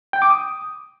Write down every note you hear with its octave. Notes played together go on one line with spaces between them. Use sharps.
G5
D6
D#6